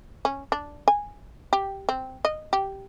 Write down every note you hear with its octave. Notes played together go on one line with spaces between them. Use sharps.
C#4
D4
G#5
G4
C4
D#5
G4